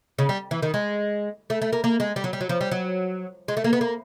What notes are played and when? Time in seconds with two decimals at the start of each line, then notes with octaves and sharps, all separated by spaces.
0.18 C#3
0.29 G3
0.51 E3
0.62 D#3
0.74 G#3
1.50 A3
1.62 A3
1.73 A#3
1.84 A#3
2.00 G#3
2.16 G3
2.24 F#3
2.33 G3
2.41 F#3
2.49 F3
2.61 G3
2.71 F#3
3.48 G#3
3.57 A3
3.64 A#3
3.73 B3
3.81 A#3